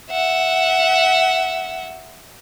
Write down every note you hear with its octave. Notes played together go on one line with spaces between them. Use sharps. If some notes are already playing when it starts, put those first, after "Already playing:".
E5 F#5